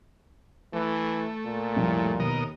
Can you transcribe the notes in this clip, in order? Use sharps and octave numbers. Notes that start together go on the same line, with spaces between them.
E3 A3
A#2
C2 F2 A2
D#2 B2 A#4 D#5